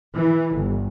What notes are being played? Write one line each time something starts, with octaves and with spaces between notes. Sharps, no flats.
E3
G1